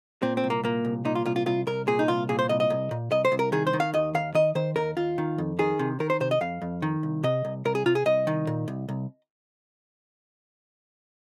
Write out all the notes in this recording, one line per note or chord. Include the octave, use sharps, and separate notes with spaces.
A#2 C4
C4
C2
A#3
A#2 A#3
C2
A#2 D#4
F4
C2 F4
F4
C2 F4
C2 A#4
A#2 G#4
D#4
C2 F4
A#2 G#4
C5
C2 D#5
D#5
C2
A#2
C2 D#5
C5
C2
A#4
D#3 G#4
C5
D#3
F5
D#2 D#5
D#2 F5
D#3 D#5
D#3 C5
D#2 A#4
D#2 F4
D#3
F2
D#3 G#4
C3
D#3 A#4
C5
C3 C5
D#5
F2 F5
F2
D#3
C2
C3 D#5
C2
C2 A#4
G#4
C3 F4
G#4
C2 D#5
D#3
A#2
C2
C2